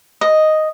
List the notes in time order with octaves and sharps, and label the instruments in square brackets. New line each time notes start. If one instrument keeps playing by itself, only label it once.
[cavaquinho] D#5